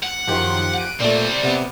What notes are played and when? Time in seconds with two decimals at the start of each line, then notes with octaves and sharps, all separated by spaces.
0.03 F#5
0.28 F#2 D#3 F3 G4 C6
0.78 F#6 D7 D#7
1.00 A#2 G3 A3 C4 D5
1.44 C3 B3